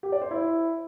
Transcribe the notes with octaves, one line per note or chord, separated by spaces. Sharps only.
G4
D5
C5
E4